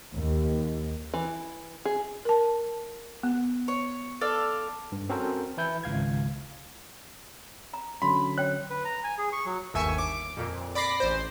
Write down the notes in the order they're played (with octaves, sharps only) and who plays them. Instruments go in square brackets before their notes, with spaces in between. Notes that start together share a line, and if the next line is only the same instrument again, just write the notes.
[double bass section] D#2
[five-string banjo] E3
G#4
[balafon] A#4 A5
B3
[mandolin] C#5
A4 D5 F5
[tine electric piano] G2
C4 C#4 F#4 A4 A#4 C5
E3 E4 G6
G#1 C#2 F5 G#6
[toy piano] A#5
[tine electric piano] D3 F#3 C#4 [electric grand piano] B5 [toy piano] C6
[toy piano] C#5 G5 [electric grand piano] F#6
[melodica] B4
A#5
G#5
G#4
C#6
F#3
[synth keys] G1 D#2 E5 G#5 C#6
D6
F2 A#2
D5 B5 D6 A#6 C7
A1 C5